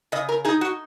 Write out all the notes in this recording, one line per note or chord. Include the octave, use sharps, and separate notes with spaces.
C#3 D#5
A#4
D#4 G#4
F#4